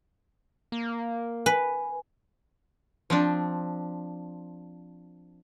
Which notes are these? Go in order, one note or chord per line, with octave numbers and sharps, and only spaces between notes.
A#3
B4 G#5
F3 C4 D4